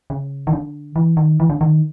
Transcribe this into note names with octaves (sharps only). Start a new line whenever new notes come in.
C#3
D#3
D3
E3
D#3
E3
D3
D#3